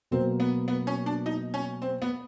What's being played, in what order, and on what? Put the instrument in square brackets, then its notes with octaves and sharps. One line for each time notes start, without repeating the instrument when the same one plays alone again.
[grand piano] B2 F#3 A#3 [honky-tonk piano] C4
[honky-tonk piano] B3
B3
C#4
D4
D#4
C#4
C4
B3